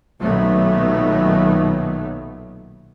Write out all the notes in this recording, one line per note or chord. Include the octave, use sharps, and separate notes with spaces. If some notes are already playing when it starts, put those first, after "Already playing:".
B1 A#2 D#3 F#3 A3 B3